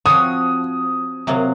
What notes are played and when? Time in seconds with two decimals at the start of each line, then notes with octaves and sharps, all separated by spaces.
0.06 F3 C4 F#4 C#5 D#6
1.27 C3 F#3 A#3